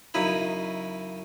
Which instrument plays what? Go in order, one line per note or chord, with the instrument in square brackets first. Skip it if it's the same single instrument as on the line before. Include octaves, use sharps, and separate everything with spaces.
[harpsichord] F#2 C#3 D#4 E4 B4